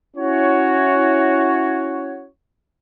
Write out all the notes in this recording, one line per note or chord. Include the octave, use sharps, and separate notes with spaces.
C#4 E4 F#4 C#5